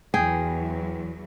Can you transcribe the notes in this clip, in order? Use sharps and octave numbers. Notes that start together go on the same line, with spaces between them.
E2 E3 F#3 G#4 G5